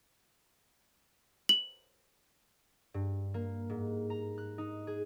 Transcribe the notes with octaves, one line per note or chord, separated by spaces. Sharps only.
F#7
G2
A#3
G#2
A#5
F#6
D#4
G#4